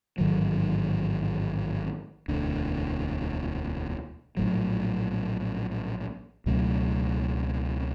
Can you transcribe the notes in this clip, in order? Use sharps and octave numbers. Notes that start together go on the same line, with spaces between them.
A1 G#2 D#3 F#3
E1 D2 D3
A#1 A2 F#3
C#2 B2 F#3 A3